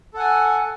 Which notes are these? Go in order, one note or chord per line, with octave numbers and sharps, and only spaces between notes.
A4 F#5 G#5